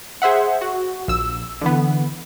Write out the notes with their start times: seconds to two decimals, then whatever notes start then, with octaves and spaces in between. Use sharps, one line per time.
0.22 G#4 C5 E5 F#5
0.61 F#4
1.08 A#1 E6
1.61 D3 E3 B3